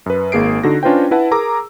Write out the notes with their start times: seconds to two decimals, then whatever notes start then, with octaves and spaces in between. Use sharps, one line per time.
0.06 F#2 B4
0.32 G#1 A#3 G#4 C7 D7
0.63 D3 D#4 F#4 A#6
0.83 C#4 D4 F4 B4 C5 G5
1.11 E4 B4 F#5 A5
1.31 G#4 A#4 A#5 D6 E6